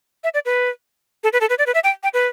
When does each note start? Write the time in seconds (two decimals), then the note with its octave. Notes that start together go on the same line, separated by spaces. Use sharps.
0.24 E5
0.34 D5
0.45 B4
1.24 A4
1.33 B4
1.41 A4
1.50 B4
1.58 D5
1.66 B4
1.74 E5
1.84 G5
2.03 G5
2.14 B4